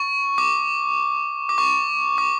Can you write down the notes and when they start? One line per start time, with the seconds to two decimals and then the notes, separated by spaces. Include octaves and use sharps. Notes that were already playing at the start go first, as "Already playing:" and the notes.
Already playing: C#6
0.38 D6
1.49 D6
1.58 C#6
2.18 D6